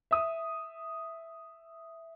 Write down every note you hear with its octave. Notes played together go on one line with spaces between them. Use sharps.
E5 D#6